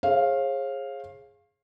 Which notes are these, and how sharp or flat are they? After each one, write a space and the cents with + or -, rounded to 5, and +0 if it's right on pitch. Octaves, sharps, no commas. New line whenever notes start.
G#4 +0 C#5 -45 F5 +0